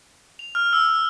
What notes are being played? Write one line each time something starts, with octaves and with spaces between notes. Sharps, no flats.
F7
F6
E6